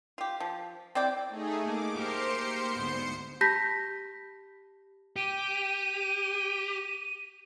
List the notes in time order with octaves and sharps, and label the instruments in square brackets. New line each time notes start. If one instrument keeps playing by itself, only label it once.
[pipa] F4 G4
F3
C4 E4 D5 G5
[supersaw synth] A3 D#4 G#4
[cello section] A#3 [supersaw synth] D6
[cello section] A#3 G4 A#4 [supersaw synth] C5 C6 C#7
[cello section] D2 G#2 B3
[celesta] G4 A5 B5 G6 A#6 B6
[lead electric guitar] G4 [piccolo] D#7